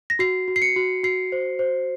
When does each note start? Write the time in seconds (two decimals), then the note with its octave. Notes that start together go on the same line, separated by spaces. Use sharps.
0.10 A#6
0.19 F#4 C7
0.48 F#4
0.56 C7
0.62 C#7
0.76 F#4
1.03 F#4 C7
1.32 C5
1.59 C5